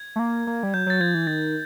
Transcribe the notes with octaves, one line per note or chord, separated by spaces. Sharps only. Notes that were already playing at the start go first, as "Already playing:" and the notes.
Already playing: G#6
A3
A#3
A#3
G3
F#3 G6
F#3 A6
F3 G#6
E3
D#3 A6